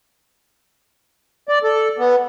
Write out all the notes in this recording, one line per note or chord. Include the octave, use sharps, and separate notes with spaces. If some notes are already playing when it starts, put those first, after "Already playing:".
D5
A4
B3